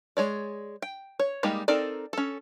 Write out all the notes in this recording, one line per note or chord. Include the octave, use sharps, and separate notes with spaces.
G#3 C#5 D5
G5
C#5
G3 G#3 A#3 D#4 G4
C4 D#4 A4 A#4 D5
C#4 A4